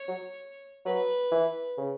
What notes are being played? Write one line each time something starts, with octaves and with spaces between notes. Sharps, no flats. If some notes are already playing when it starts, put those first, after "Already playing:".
Already playing: C#5
F#3
F#3 B4
E3
C#3